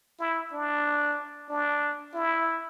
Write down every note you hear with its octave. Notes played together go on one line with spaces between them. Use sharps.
E4
D4
D4
E4